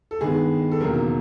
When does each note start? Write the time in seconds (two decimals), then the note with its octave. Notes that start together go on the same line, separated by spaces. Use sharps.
0.11 A4
0.21 G2 D#3 G#3 B3 G#4
0.71 A4
0.80 E1 D#2 C#3 F#3 A#4